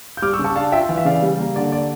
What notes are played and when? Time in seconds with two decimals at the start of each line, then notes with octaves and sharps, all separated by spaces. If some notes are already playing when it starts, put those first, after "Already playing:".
0.17 G6
0.22 G3 D6 F6
0.33 C#6 E6
0.39 C#3
0.44 A5 C#6
0.56 D4 F5 A5
0.72 F4 E5 G5
0.89 E3 F5
0.98 E5
1.05 C#3 D5 F5
1.22 G3
1.39 A#3
1.56 D3 D5
1.72 D5